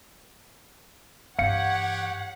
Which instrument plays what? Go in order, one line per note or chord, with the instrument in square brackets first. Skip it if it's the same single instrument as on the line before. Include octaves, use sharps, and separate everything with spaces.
[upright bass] G2 E3 [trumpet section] G4 C#5 [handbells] F5 C#7 [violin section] F#5